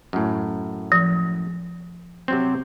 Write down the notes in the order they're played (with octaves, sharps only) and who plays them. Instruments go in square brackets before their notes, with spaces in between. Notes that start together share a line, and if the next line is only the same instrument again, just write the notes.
[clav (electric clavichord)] F#2 A2
[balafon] F3
[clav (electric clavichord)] C3 F#3 C4